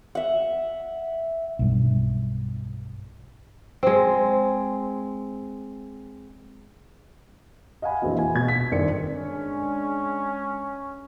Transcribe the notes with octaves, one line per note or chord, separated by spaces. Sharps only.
E5 F#5
B1 G2
G#3 C4
D#5 F5 F#5 G#5 B5
A#1 F2 E3 A#3 C4 F#4
G#5
B2 G#6
B6
G1 D#3 C4 A#4 D5 C#7
G#3 C#4 D4